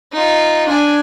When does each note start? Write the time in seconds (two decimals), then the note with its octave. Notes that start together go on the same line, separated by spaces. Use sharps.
0.12 D#4 F4
0.69 D4 G#5